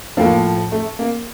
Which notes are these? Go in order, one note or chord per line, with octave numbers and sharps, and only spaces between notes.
A2 F3 A#3
A3
A#3